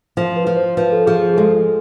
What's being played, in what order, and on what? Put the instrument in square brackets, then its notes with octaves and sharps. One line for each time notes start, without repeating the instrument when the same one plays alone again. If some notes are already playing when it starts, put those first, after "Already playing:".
[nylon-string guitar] F3 [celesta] C5
[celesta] B4
[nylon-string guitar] F3
[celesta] C5
[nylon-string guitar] F3 [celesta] B4
[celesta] A4
[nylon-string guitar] F3 [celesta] G#4
[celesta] G#4
G#4
[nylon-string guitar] G#3 [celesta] A4